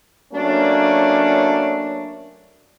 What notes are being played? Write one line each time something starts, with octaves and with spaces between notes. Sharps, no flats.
F#3 A3 A#3 C#4 D4